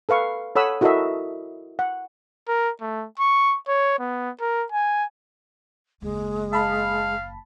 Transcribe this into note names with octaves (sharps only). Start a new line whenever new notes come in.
A4 B4 F5 C#6
A4 C#5 F#5 B5 D#6 E6
E4 F#4 A4 A#4 D#5 E5
F#5
A#4
A3
C#6
C#5
B3
A#4
G#5
F#1 D#2 G#3
F5 A5 B5